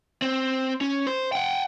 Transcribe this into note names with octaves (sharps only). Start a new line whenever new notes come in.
C4
C#4
C5
F#5 G5